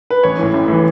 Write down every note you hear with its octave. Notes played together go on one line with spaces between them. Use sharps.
B4
A1 C#5
A2 E3
A1
A2 E3